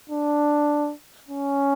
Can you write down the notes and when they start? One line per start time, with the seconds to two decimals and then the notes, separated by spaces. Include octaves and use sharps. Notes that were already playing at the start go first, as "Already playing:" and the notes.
0.10 D4
1.29 C#4